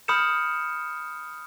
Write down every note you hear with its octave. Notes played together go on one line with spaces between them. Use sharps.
B5 D#6 F6 G6 C#7 E7